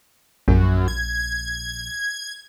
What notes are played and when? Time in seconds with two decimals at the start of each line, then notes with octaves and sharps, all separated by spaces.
0.48 A#1 F#2
0.88 G#6